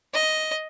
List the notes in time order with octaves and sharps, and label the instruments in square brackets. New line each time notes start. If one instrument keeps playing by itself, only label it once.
[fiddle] D#5